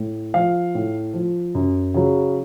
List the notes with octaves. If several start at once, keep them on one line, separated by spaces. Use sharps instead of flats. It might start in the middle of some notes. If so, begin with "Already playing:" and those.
Already playing: A2
F3 F5
A2
F3
F#2
C#3 F#3